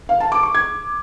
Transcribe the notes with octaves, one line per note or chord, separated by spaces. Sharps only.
F5
A5
D6
C#6
G#6